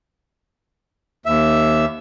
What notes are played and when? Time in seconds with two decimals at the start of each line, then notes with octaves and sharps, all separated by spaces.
1.26 D#2 E5